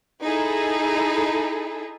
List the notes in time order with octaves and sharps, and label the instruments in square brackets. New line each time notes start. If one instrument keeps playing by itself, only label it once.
[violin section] D#4 E4 G#4 A4